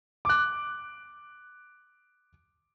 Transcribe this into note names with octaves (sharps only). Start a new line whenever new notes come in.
D6 F#6